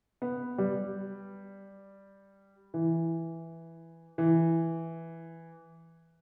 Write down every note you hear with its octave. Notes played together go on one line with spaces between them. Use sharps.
B3
G3
E3
E3